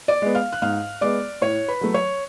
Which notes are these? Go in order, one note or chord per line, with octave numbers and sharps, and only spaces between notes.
D5 D6
G#3 B3
F5 F6
F#6
G#2 F5 F6
G#3 B3 D5 D6
A2 C#5 C#6
B4 B5
F#3 A3
C#5 C#6